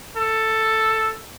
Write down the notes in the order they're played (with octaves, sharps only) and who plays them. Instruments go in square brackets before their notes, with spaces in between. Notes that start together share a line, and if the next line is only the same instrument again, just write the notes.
[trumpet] A4